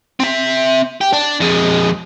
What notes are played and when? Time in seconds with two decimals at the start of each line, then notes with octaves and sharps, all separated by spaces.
0.20 C4 E5
1.01 G4
1.13 D4
1.41 F2 G#3